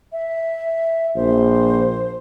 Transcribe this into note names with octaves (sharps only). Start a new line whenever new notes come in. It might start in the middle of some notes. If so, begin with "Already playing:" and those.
E5
A#1 C5